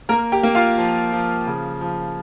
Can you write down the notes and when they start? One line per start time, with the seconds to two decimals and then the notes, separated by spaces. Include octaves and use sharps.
0.09 A#3 A#4 A#5
0.32 G4 G5
0.43 A#3
0.55 F4 F5
0.78 F3
1.12 F3
1.47 C#3
1.81 F3